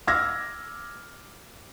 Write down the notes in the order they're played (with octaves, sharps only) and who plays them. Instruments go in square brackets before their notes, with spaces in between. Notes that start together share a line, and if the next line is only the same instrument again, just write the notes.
[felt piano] D6 E6 F6 G#6 A#6